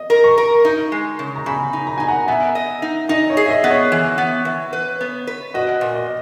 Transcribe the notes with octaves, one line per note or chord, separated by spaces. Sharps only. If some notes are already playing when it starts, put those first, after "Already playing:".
Already playing: D#5
A#4
A#5 C#6
A#4
D#4
G#3
C#3
A#5
C#3 G#5 B5
D#4
A#5
D#4 G#5
F#5 A#5
B3 E5 G#5
D#5
D#4
D#4 D#5
C#5
G#4
E5
D#5
B3
C#5
E3
B3
E3
B4
B3
B4
F#4 D#5
A#2
D#5